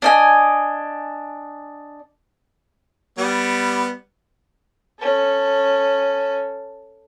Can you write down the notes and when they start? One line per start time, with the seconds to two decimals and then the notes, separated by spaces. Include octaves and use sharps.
0.02 D4 D#5 G#5
3.18 G3 B3
4.99 C#4 A4